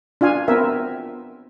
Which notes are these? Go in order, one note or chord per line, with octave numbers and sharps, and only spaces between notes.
D4 F4 F5 G#5
B3 C4 A#4 E5